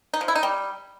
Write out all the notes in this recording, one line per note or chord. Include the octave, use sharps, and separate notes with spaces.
D#4
F3
E4
D#4
G3